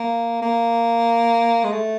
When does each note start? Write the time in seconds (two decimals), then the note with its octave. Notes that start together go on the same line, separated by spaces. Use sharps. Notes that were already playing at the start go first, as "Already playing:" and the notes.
Already playing: A#3
0.42 A#3
1.64 G#3
1.72 A3